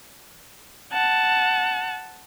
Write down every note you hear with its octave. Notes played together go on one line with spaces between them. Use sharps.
F#5 A5